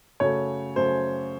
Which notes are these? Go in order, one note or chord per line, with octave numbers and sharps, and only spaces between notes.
F#2 C#3 F#3 A3 C#5
F#2 C#3 F#3 A3 C5